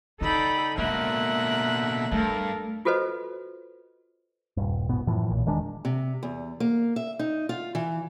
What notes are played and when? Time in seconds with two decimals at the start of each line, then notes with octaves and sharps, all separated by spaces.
0.21 C#3 D#4 A4 D5 G5 B5
0.78 B2 D3 G#3 A#3 E5 A#5 F#6
2.12 G2 A3 A4 A#4
2.85 F4 F#4 A4 B4 C5 D#5
4.57 D#1 G2
4.89 A#1 G#2 B2 B3
5.07 F#2 A2 E3 F3
5.30 B1 A#2
5.46 E1 D#3 G#3 D4
5.85 C3
6.23 E2
6.60 A#3
6.96 E5
7.19 D#4
7.49 F4
7.75 E3